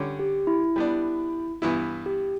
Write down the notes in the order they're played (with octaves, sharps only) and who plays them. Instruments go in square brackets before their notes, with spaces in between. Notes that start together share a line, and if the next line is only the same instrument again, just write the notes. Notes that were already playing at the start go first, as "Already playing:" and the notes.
Already playing: [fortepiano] D3 G3 C#4
[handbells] G4
E4
[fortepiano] G3 B3 D4
G2 E3 B3 E4
[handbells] G4